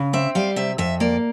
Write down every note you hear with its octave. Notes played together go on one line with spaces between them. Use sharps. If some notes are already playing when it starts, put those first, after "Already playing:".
Already playing: C#3
C4 E5
G3 F5
C3 E5
F2 E5
A#3 D5